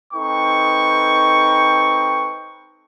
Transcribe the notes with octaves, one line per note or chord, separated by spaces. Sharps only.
C4 D#4 A4 B4 G5 C#6